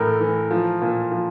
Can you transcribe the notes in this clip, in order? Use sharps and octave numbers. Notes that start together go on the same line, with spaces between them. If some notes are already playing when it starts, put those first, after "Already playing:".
Already playing: A2 E3 A4 A#4
E3
F3
A#2
F3